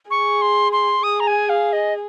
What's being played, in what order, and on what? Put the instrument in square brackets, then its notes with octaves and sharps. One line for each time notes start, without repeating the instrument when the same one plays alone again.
[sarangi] G#4 [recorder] C#6
[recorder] C6
C6
[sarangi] G#4 [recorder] D#6
[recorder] A#5
G#5
F5
D#5